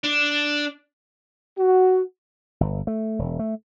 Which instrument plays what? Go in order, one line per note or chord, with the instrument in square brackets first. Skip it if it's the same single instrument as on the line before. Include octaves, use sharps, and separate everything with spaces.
[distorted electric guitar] D4
[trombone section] F#4
[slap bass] G1
A3
E1
A3